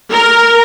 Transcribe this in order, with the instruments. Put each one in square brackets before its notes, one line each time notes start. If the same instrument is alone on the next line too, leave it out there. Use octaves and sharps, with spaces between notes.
[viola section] A#4